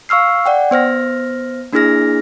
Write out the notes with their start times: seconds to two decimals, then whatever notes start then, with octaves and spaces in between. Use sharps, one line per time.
0.09 F5 C#6 E6 F6 C7
0.46 D5 F#5 G5
0.71 B3 C5 F6 A#6
1.73 A#3 D4 E4 G#4 F6 A#6